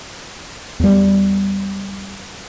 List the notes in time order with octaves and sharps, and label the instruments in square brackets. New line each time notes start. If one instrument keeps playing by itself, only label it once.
[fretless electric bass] E2 G3